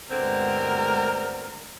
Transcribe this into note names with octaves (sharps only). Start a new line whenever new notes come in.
D2 G2 B2 D3 G#3 C4 A#4